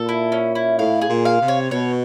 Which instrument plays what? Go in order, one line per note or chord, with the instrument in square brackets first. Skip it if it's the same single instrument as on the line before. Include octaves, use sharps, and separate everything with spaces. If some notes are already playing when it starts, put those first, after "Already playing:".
Already playing: [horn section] A#2 [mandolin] A4
[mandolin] E4
C#4
E4
[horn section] A2 [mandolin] F5
[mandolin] G#4
[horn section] A#2
[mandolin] F5
[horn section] C3
[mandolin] C#5
[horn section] B2 [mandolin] C#5